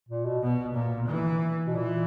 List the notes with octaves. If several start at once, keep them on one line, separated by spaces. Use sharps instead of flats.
A#2
B2
B2
A#2
E3
B2
A#2 E3